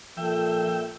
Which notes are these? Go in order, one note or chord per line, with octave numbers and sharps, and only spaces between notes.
A#2 F3 A4 E5 G5